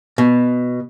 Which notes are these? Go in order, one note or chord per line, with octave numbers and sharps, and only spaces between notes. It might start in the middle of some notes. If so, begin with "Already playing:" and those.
B2